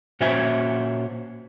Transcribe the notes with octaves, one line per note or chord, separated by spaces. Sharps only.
A#2 C#4 F#4 C5 E5 G#5